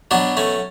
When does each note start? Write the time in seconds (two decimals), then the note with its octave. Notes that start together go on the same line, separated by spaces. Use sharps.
0.11 B2 F#3 B3 D4
0.37 A3 C#4